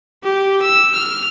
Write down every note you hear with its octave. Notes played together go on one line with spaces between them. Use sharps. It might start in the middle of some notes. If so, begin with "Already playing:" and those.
G4
E6
F6